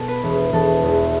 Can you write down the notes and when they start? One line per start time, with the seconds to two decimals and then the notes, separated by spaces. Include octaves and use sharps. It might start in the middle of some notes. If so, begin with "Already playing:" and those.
Already playing: B2 A4
0.08 B4
0.23 E1
0.53 E1 A4
0.83 E2